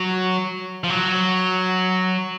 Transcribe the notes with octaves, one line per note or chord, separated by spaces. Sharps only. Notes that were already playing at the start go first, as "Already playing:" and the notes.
Already playing: F#3
F3
F#3